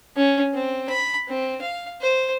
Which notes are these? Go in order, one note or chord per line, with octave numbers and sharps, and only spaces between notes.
C#4
C4
B5
C4
F5
C5